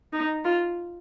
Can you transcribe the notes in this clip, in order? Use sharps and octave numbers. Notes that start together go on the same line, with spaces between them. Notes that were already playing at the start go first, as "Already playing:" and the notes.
D#4
F4